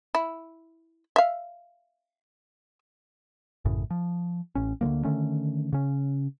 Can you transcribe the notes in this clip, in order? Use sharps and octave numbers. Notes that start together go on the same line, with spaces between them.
E4
E5 F5
A1 F#2 A2 C#3
F3
A1 C#4
D2 D3 F3 A#3
D3 D#3 A3 C#4
C#3 C#4